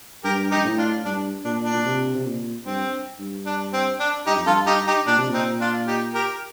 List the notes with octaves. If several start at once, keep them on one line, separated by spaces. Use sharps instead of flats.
G2 G4 A#4
D#4 G4
G2
A2
D4 F4
G2 D4
A#2 D4
D4
A#2
C3
C3
A#2
G2 C4
G2
D4
C4
D4
G2 D#4 G4
F2
G2 F4 A4
D#4 G4
D#4 G4
A#2 D4
C3
A#2
C4 D#4
D4 F4
D#4 G4
G4 A#4